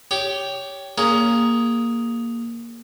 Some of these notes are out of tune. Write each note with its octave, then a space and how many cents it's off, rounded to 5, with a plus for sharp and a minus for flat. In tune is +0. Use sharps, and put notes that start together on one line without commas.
G4 +0 C#5 +15
A#3 +0 C#4 +30 G#4 +0